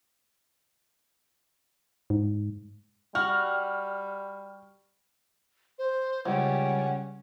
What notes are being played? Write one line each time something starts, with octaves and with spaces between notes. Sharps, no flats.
G#2
G3 F#4 F6
C5
C#2 G3 C#4 F#5